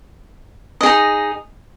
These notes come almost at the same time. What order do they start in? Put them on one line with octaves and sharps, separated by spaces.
D#5 G#4 D#4